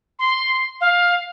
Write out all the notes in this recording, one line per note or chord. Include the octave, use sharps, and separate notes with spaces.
C6
F5